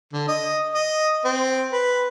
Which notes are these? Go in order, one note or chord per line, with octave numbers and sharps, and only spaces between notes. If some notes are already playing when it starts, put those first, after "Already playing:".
D3
D#5
D#5
C4
B4